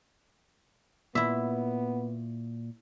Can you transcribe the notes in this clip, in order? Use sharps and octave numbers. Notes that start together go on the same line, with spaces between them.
A#2 B3 E4 E5